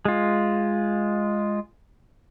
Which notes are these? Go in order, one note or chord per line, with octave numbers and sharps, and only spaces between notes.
G#3 F4